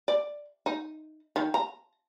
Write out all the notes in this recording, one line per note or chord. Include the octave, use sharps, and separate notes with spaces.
D5
D#4
D#3
A#5